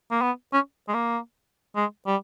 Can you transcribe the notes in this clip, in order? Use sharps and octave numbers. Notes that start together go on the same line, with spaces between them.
A#3
B3
C#4
G#3
A#3
G#3
G3